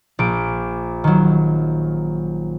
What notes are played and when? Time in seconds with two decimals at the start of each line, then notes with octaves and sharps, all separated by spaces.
0.19 A#1 D6 D7
1.04 D#3 F#3